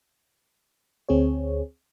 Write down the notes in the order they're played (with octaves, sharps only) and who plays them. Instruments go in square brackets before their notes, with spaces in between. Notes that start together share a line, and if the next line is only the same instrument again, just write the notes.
[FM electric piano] D2 C4 G#4 C#5